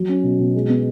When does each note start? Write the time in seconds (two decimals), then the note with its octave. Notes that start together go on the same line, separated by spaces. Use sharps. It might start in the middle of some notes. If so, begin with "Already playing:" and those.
Already playing: F#3
0.09 C#4
0.23 B2
0.39 B2
0.55 G#3
0.69 B3